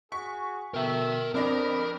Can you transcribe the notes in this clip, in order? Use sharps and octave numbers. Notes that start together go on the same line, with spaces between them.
F#4 G#4 C#6 B6
B2 A4 A#4 E5 G5
F2 C4 D4 A#4 D#5 B5 A#6